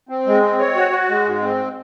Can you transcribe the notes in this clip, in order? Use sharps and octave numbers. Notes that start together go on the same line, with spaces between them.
C4
G#3
C4
C#5
F#4
F#4
G#3
G#2
C4